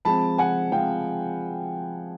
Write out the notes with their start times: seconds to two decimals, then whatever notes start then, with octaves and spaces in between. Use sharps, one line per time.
0.05 F3 G#3 C4 A5 B5
0.38 F#5 G#5
0.72 F3 G#3 C4 F5 G5